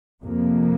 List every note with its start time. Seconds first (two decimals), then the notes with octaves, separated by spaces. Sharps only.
0.22 F2 C3 A#3